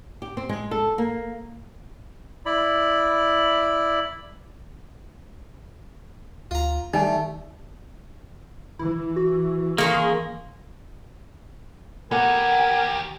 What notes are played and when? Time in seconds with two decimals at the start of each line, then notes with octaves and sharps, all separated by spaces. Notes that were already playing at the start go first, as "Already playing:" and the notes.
0.22 G4
0.37 C4
0.49 G#3
0.71 A4
0.98 A#3
2.46 E4 D5 B5
6.51 D2 F4 A#5
6.94 D#3 G3 A3 D#4 G#5
8.79 E3 E4
9.16 F#4
9.78 D#3 G#3 A#3 C#4 G#4
12.11 D#2 B3 G4 A#4 F#5 G#5